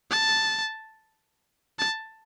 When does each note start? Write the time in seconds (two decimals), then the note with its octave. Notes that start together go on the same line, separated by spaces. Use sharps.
0.11 A5
1.79 A5